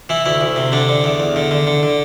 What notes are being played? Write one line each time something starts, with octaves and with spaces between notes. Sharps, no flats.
E3 E4
D2 E4
D2
C3
D3 D4
D3
E2
E2
D3
D3
D3
D3